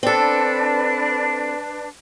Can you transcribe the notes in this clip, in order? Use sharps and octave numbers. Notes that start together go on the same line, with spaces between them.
C4 D4 A4 B4